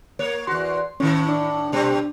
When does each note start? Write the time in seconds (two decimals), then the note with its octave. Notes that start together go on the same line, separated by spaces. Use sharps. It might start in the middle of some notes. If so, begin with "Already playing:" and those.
0.19 A#3 C#5
0.47 E2 F#4 C6
1.00 A2 D#3 C#4
1.29 D4
1.72 B2 G3 C4